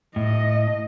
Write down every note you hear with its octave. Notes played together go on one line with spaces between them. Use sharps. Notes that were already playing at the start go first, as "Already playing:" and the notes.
A2 D#5